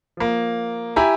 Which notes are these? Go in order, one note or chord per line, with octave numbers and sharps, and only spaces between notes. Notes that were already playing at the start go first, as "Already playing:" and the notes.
F3 A#3
E4 G4 G#5 A#5